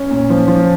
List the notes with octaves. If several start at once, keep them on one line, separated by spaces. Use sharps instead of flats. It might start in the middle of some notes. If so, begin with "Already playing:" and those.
Already playing: C#4
A#2
F3
F3